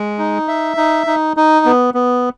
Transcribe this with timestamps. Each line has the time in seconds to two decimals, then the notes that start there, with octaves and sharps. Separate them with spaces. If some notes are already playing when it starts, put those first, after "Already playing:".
Already playing: G#3
0.19 D#4
0.48 E5
0.77 D#4
1.07 D#4
1.37 D#4
1.66 B3
1.94 B3